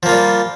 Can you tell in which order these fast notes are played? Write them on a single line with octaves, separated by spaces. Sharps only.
F3 A#3 F4 G3